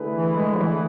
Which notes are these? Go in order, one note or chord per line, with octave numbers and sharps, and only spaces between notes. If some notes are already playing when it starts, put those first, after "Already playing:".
Already playing: D3 A3 E4 G#4 B4
E3
G#3
E3